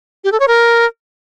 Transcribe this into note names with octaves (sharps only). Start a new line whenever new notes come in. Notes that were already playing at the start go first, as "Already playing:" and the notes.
G4
A4
C#5
A#4